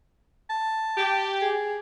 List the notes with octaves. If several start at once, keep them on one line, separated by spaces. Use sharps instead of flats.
A5
G4
G#4